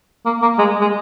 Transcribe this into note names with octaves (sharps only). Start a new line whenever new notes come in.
A#3
A#3
G#3
G#3